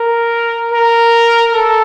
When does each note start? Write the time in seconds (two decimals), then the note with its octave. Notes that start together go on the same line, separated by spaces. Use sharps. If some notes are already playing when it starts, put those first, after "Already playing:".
Already playing: A#4
0.72 A#4
1.53 A4